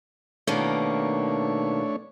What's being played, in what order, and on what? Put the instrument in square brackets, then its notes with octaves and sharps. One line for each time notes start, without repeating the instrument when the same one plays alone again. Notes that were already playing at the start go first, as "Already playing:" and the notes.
[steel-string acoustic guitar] B2 D#3 A#3 [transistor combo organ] A3 D4 C#5